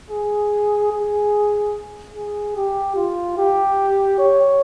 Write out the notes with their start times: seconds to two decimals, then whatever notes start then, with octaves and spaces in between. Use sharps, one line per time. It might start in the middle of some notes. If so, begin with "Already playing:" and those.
0.11 G#4
0.92 G#4
2.14 G#4
2.56 G4
2.96 F4
3.38 G4
4.19 C#5